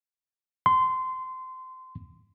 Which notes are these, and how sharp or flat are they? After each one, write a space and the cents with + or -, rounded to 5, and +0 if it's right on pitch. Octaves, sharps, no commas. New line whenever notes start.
C6 -20